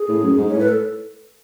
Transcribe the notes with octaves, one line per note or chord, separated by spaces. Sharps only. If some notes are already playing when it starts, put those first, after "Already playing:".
Already playing: G#4
A2
F#2
G#2
A2 C#5
B4
A4